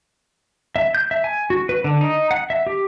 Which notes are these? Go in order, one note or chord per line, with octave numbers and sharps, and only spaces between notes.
E5
G6
E5
G#5
F#4
B4
D3
D#4
F#5
E5
G4